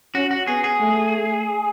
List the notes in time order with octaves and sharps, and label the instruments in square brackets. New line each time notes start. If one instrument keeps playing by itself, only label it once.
[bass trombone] C#4 [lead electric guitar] F#4
[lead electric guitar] F#4
[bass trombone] B3 [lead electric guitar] G#4
[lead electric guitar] G#4
[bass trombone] A3